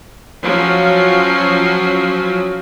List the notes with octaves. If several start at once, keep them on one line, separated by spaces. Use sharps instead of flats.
F3 F#3 C#4